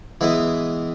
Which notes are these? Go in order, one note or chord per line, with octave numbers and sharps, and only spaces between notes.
E3 G#3 B3 E4